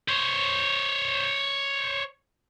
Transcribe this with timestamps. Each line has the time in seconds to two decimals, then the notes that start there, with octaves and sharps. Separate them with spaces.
0.08 C5 C#5